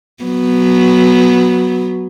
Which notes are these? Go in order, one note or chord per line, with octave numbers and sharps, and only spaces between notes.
F#3 B3